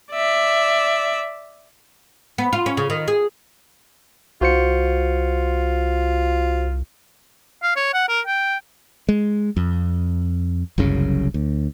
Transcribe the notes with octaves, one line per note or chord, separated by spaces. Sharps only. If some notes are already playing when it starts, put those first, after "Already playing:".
D5 E5
B3
F4
C#4
C#3
D#3
G#4
C2 F4 F#4 C5 C#7
F5
C#5
F#5
A#4
G5
G#3
F2
F#1 C2 F#2 C#3
D2